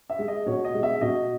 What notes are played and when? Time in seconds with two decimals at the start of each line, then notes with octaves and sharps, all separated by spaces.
0.10 E5
0.19 G#3
0.28 D#5
0.46 B2 C#5
0.65 D#5
0.74 G#3
0.83 E5
1.01 B2 D#5